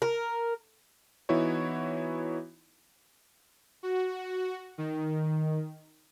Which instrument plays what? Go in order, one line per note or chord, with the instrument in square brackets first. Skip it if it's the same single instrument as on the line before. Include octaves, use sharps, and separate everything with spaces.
[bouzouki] A#4
[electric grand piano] E3 B3 D#4 E4 F#4 C#5
[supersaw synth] F#4
D#3